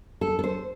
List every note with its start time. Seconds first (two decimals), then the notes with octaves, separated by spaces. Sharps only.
0.21 A4
0.39 A4
0.44 C5